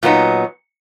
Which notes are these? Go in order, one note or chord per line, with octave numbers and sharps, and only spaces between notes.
A#2 F#3 B3 D#4